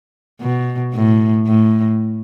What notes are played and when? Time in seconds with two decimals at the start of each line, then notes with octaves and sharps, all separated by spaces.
0.42 B2
0.94 A2
1.47 A2